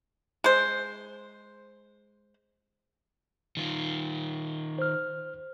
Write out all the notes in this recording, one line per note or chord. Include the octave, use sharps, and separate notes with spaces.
G#3 C5
D#3 F4
C5 F6